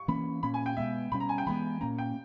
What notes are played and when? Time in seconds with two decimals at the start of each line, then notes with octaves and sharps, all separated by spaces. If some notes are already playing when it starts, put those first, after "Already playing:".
Already playing: C#6
0.08 E3 A#3 C#4 B5
0.43 A#2 A#3 C#4 B5
0.54 G#5
0.66 G5
0.77 B2 G#3 B3 E5
1.12 B2 G3 C#4 B5
1.20 A#5
1.29 G#5
1.38 G5
1.47 E3 G#3 B3 B5
1.81 A#2 A#3 C#4 A#5
1.99 G5